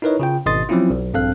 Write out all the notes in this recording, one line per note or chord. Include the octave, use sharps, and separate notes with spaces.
D#4 E4 A#4 B4 C#5 D#5
C#3 F4 G5
G#1 B2 D#5 C6 D#6 A6
F3 F#3 C4 C#4 E4 F4
B1
A#1 G2 C4 A4 F5 F#6